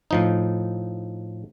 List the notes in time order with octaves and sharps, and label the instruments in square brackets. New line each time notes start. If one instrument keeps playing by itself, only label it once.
[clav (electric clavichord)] A2 F3 D#4